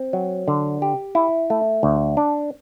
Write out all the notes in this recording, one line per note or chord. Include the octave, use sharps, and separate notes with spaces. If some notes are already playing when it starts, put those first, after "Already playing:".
Already playing: C4
F#3
D3
G4
E4
A3
D2
D4